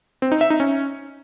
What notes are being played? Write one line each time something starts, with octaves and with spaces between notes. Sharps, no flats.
C4
D#4
E5
D#4
C#4